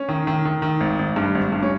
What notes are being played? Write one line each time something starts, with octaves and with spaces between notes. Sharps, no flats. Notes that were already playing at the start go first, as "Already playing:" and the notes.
Already playing: C#4
D#3
D#3
D#3
D#3
G#1
G#1
G2
G#1
G2
C#4